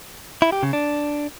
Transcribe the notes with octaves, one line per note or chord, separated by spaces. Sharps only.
E4
G4
C#3
D4